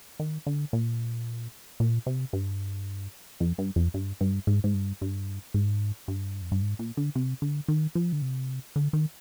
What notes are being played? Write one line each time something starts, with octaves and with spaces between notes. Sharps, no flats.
D#3
D3
A#2
A#2
C3
G2
F2
G2
F2
G2
G2
G#2
G#2
G2
G2
G#2
G2
F2
G2
G#2
A#2
D3
C3
D3
D#3
F3
D3
C3
D3
D#3